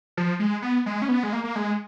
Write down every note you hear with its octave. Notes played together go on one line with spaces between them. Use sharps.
F3
G#3
B3
G#3
C#4
B3
G#3
A#3
A#3
G#3